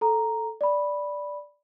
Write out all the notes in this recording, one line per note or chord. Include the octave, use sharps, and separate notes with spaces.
A4 A#5
D5 B5